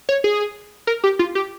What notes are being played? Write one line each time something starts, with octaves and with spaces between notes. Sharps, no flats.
C#5
G#4
A#4
G4
F4
G4